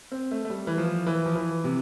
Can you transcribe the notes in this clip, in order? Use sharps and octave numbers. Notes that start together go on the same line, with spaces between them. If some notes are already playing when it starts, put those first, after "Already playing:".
C4
A3
A3
G3
E3
F3
E3
F3
E3
C3